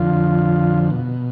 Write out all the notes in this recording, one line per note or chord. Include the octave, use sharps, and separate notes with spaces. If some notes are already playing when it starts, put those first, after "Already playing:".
Already playing: F2 D3 F3 F4
B2